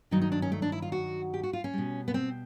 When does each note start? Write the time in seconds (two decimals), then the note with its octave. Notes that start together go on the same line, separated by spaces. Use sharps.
0.11 G2 D#3 F#3 D#4
0.22 D#4
0.32 D4
0.42 C#4
0.52 A3
0.62 D4
0.72 E4
0.82 F4
0.92 F#4
1.34 G4
1.43 F#4
1.53 F4
1.64 C#4
1.73 B2 G3
2.08 B3
2.14 C4